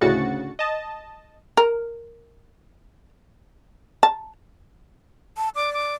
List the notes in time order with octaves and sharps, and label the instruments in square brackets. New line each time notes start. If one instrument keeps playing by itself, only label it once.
[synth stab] D2 A2 C#3 F#4 A6 C#7
D#5 A5
[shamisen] A#4
A5
[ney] A5
[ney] D5 [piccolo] D6
[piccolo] D6